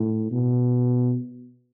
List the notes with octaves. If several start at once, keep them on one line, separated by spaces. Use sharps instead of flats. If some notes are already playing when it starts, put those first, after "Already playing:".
Already playing: A2
B2